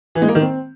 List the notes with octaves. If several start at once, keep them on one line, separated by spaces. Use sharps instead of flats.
E3
G#3
A#3
D#3
C4